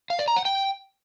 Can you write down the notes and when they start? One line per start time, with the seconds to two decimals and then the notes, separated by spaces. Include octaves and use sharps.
0.10 F5
0.19 D5
0.28 A#5
0.36 F#5
0.45 G5